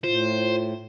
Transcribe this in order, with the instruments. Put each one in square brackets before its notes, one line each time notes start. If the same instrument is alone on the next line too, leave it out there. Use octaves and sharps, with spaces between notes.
[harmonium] A2 [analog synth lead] F4 [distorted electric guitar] C5